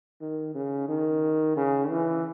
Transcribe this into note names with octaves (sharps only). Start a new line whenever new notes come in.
D#3
C#3
D#3
C#3
E3